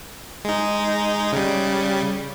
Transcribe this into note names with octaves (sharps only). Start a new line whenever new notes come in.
G#3 D#4
C#3 G3